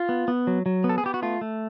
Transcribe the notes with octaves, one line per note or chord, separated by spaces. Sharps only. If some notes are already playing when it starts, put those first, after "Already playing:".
Already playing: F4
B3
B3
F#3
F#3
B3
A4
G#4
B3 G4
F#4
A3 F4
A3